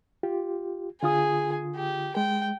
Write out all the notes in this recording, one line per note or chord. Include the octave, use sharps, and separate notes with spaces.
F4 G4
D3 F4 G#4 D#6
G4
G#3 G5